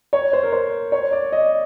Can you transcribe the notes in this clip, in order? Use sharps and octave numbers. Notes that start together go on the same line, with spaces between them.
C#5
C5
A#4
C5
C#5
D5
D#5